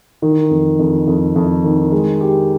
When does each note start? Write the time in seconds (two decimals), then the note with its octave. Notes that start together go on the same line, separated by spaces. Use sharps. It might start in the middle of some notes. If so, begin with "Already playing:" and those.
0.22 D#3
0.51 F2
0.79 F2
1.07 F2
1.36 F2
1.64 D#3
1.92 G#3
2.21 G4